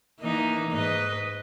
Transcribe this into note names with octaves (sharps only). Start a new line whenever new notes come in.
E3 A#3 D#4
G#2 B4 D#5